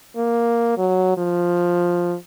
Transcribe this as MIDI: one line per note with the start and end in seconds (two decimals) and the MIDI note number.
0.16 0.74 58
0.78 1.15 54
1.17 2.16 53